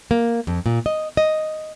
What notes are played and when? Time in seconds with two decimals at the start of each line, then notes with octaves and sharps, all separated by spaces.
0.11 A#3
0.47 F2
0.66 A#2
0.86 D#5
1.17 D#5